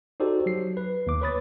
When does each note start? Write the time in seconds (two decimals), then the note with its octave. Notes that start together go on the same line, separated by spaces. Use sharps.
0.20 D#4 F#4 G4 A4 C5 D5
0.46 F#3 C7
0.77 B4
1.07 D#2 D6
1.22 B4 C#5 B5 D#6 A6